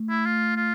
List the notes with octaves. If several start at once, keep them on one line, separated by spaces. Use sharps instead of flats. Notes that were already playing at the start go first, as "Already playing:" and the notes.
Already playing: A3
E4
F4
F4